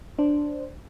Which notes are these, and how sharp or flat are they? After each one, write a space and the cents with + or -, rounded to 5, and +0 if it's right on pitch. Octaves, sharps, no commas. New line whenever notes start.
D4 +0 C5 +0